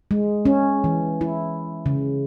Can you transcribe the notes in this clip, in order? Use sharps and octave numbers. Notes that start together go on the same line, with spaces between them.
G#3
C#4
E3
E4
C#3